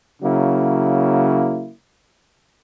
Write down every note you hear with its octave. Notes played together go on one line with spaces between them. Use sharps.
C#3 F#3 A#3 E4